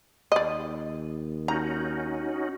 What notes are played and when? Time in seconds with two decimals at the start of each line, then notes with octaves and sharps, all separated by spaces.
0.32 D#2 D5 D#5
1.48 C#4 D#4 F#4 A#5